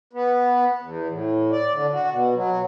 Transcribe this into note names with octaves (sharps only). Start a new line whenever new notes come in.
B3
E2
A2
D5
D3
F#4
B2
F#3